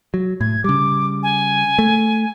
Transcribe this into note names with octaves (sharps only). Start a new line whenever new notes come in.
F#3
A2 G#6
C#3 G3 D6
G#5
A3